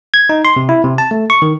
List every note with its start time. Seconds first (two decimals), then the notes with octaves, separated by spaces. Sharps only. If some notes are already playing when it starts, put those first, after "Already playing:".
0.14 G#6
0.29 D#4
0.45 C6
0.56 C3
0.69 E4
0.84 C3
0.98 A5
1.11 A3
1.30 C#6
1.42 D#3